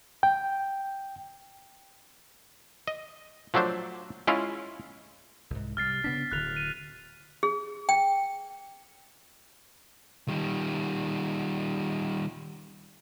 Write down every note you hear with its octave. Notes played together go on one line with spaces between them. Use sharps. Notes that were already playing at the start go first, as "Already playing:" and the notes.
G5
D#5
F3 F#3 A3 D4 C5
G#3 C#4 E4 F4
C2 G#2
C3 G3 F6 A6 C7
C#3 B3 D4 B6
D1 D3 F#6 F7
D#7
G#4
G5
D#3 G3